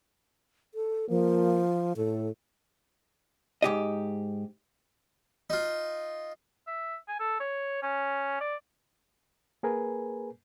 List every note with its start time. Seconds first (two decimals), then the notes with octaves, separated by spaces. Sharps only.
0.74 A4
1.09 F3 A#3
1.97 A2 A4
3.62 G#2 G4 D#5
5.50 D#4 F4
6.67 E5
7.08 G#5
7.20 A4
7.40 C#5
7.82 C#4
8.41 D5
9.63 A#3 G#4 A#4 B4 G#5